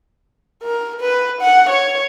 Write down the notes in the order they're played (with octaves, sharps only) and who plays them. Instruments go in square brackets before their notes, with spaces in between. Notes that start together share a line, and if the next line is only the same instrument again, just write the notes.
[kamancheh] A#4
B4
F#5
C#5